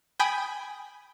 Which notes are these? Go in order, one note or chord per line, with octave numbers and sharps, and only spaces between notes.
G5 G#5 B5 D#6